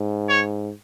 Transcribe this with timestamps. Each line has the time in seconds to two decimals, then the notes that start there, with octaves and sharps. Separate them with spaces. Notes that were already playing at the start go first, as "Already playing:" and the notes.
Already playing: G#2
0.29 C#5